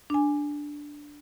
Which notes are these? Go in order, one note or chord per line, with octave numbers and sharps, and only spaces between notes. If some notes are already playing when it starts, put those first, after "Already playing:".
D4 G#5